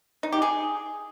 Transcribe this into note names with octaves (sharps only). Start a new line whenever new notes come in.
D#4
G4
G#4